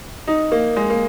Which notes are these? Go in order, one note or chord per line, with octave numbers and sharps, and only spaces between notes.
D#4
A#3
G#3
A#3